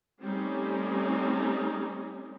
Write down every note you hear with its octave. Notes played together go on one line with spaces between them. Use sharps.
G3 A3 C4 C#4 D#4